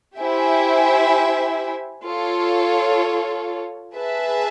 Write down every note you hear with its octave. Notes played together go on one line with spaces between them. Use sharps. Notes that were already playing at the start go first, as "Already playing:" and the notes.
E4 G4 C5 E5 G#5
F4 A4 C#5
G#4 B4 E5 A5